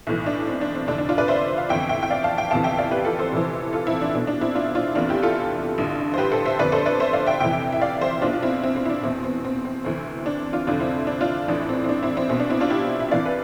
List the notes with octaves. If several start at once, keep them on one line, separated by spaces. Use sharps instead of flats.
B1 A2 E3
D4
C4
D4
C4
F1 F2 D3 D4
D4
D4 F4
B4 D5
C5 E5
F5
G1 F2 E3 E5 G5
E5 G5
G5
D5 F5
F5 A5
E5 G5
G1 F2 C3 E3 F5 A5
E5 G5
D5 F5
G4 B4
F4 A4
A4 C5
F1 F2 E3
F4 A4
C4 E4
D4
B1 B2 D4
D4
C4 E4
D4 F4
D4 F4
F1 E2 C3 E3 D4 F4
E4 G4
F4 A4
A1 G2 D3
C5
G4 B4
A4 C5
C5 E5
G1 F2 D3 B4 D5
A4 C5
B4 D5
C5 E5
D5 F5
E5 G5
F1 F2 C3 E3 E5 G5
E5
D5 F5
C5 E5
B1 B2 D4 F4
F4
C4 E4
C4
C4
E4
D4
E2 B2 C4
C4
C4
C4
D2 C3 E3 C4
D4
D4 F4
F1 F2 D3 D4 F4
C4 E4
D4
D4 F4
A1 A2 E3 D4
C4
C4
D4
C4 E4
C4 E4
B1 B2 C4
D4
C4 E4
D4 F4
E4 G4
E5
C2 C3 E3 D5 F5
B4